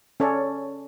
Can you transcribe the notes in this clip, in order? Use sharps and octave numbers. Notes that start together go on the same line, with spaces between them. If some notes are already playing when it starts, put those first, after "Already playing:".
C#4 A4 C#5 D5